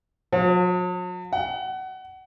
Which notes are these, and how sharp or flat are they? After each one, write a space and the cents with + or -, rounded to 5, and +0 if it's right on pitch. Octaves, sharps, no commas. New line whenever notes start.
F#3 -45
F#5 +25